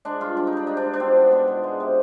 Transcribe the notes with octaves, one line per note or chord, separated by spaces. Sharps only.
G#3 D4
G2 F4
G3 D4
D#4
G3 D4
G#2 D#4
D4
G#2
D4
B2 C4
B3
B3
B2
G#3
C3